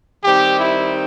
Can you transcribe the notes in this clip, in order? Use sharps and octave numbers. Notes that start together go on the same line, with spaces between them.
D#3 G3 C4 D#4 G4
E4